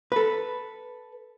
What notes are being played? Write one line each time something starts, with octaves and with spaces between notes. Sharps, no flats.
A4 B4